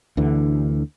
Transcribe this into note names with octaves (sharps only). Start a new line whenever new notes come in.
D2 D3 E3